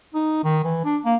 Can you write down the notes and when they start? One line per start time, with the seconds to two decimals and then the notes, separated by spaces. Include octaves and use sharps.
0.14 D#4
0.44 D#3
0.64 E3
0.85 D4
1.05 A#3